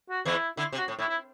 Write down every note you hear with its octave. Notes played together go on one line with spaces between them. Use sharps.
F#4
E2 E3 E4
D3 E4
C3
F#4
A2
A2 E4
E4